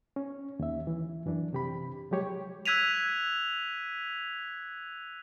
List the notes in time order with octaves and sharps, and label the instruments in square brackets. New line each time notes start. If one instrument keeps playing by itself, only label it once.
[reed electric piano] C#4
D#2 E5
E3
F#2 E3 D4
C3 G4 B5
F3 F#3 G#3 G4 C#5
[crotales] E6 F#6 G#6 B6 D#7 F7